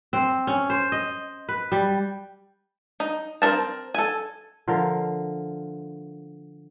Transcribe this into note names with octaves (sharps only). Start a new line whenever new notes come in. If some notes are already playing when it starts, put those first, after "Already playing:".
C4
C#4
C5
D#5
B4
G3
D#4
C4 G#4 A#4 A5
A4 G#5
D3 F3 A#4 F5